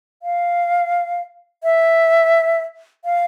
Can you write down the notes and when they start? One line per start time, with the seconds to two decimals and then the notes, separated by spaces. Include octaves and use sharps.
0.23 F5
1.63 E5
3.05 F5